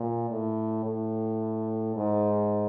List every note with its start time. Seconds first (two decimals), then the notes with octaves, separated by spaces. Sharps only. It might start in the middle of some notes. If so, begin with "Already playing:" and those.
Already playing: A#2
0.31 A2
0.85 A2
1.96 G#2